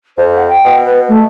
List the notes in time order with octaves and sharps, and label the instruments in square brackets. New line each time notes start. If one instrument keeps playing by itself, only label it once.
[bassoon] F2 [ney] C5
[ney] F#5
G5
[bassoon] B2
[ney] B4
A3